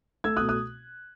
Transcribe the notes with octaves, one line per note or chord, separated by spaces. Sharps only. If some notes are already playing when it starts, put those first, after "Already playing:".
A3 E6 G#6
D#6 F#6
B2
D#6 F#6